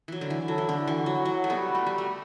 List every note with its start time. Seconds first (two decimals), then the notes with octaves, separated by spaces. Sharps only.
0.08 E3 F#3
0.21 D3
0.30 E3
0.48 F#3 A4
0.58 E3
0.69 D3
0.87 E3 F#4
1.06 F#3
1.25 F#3
1.44 A3
1.50 G3 B3
1.75 A3
1.86 G3
1.98 A3